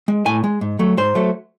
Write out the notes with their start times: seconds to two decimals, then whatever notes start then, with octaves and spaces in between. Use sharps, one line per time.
0.08 G#3
0.26 A2 G#5
0.44 G#3
0.61 G#2
0.79 F#3 A3
0.97 G#2 C5
1.15 F#3 A3